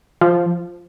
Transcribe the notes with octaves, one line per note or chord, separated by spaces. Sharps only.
F3